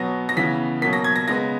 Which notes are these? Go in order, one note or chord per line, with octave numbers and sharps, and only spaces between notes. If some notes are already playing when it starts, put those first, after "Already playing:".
Already playing: B2 F#3 B3 A#6
A#6
C#3 E3 B3 B6
B2 F#3 A#3 B6
A#6
G#6
A#6
C#3 G#3 B3 A#6